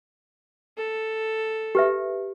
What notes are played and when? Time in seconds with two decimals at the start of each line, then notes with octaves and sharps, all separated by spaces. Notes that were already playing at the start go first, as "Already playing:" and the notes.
0.78 A4
1.75 G4 B4 E5